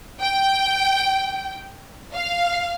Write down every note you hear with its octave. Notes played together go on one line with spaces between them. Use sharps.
G5
F5